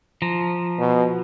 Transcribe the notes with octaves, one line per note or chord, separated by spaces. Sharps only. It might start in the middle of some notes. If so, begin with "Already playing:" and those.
F3 A#5
B2